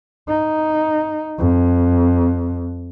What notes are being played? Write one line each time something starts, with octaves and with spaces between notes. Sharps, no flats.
D#4
F2